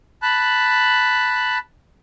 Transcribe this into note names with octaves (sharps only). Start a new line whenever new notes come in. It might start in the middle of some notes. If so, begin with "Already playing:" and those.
A5 B5 F#6